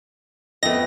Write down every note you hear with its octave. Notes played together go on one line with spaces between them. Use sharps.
F2 A3 B3 D#5 A#6